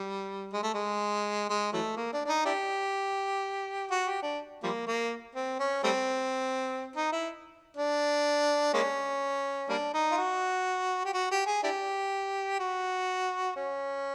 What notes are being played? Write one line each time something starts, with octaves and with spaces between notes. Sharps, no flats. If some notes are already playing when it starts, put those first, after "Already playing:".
Already playing: G3
G#3
A3
G#3
G#3
E3 F#3 A3
A#3
D4
D4
D#4
D4 E4 G4
F#4
G4
D4
F3 G3 A#3
A#3
C4
C#4
G3 A3 C4
D#4
E4
D4
G#3 A#3 C#4
G3 A#3 D4
D#4
F4
F#4
G4
F#4
G4
G#4
D4 E4 G4
F#4
C#4